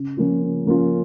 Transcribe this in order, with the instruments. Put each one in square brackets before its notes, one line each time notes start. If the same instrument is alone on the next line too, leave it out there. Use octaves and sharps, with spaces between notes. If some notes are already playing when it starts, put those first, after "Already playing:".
Already playing: [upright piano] C#3
F3 A#3 C#4 F4
C#3
F3 A#3 C#4 F4